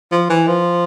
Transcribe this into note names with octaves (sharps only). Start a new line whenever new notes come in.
F3
E3
F3